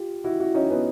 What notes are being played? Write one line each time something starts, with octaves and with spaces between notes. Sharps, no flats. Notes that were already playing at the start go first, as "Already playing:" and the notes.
Already playing: F4 G4
E4 F#4
E4 F#4
C#4 D#4
B3 C#4